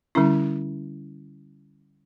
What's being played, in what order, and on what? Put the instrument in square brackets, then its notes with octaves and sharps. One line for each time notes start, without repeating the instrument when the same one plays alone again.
[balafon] D3 G3 C#4 E4